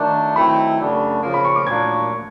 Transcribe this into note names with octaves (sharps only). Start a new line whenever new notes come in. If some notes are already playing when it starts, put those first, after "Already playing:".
Already playing: D#3 F#3 A3 D4
D#3 F#3 A3 C4 E4 B5
F#2 C#3 F#3 A3 D4
C#3 F3 A#3 C#4 F4
B5
C#6
D6
A#2 F#3 A#3 D4 F4 G#6